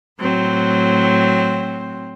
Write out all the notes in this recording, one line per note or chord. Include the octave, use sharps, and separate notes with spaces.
A2 F#3 C4